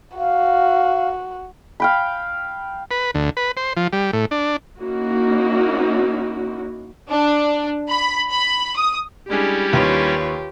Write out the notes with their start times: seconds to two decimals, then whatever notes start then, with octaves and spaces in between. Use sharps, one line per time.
0.17 F#4 F5
1.80 F5 G5 B5
2.91 B4
3.14 D2
3.37 B4
3.57 C5
3.77 F3
3.93 G3
4.13 A2
4.31 D4
4.80 A#3 C#4 D#4 E4 F#4
7.09 D4
7.89 B5
8.30 B5
8.77 D#6
9.30 G3 G#3 C#4 D4 E4 G4 G#4
9.73 D#2 D#3 F4 B4 C#5